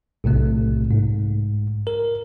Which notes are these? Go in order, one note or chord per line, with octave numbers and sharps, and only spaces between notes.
B1 A2 C3 A3
G#2
A#4